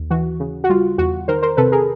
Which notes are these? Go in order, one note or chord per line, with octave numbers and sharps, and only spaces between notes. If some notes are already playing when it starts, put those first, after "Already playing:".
Already playing: D#2
E3 F#4
C#3
F#4
G3 F4
E2 F#4
D#3 A#4 C5
A#4 C5
C3 A4 B4
G#4 A#4